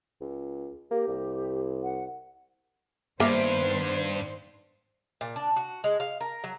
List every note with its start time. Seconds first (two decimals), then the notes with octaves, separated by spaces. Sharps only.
0.21 C#2
0.91 A#3 G4
1.08 C2
1.84 F#5
3.20 G2 D#3 A#3 B3 C5 E5
5.21 A#2
5.36 D4
5.56 F#4
5.84 G#3
6.00 F5
6.20 A#4
6.44 F#3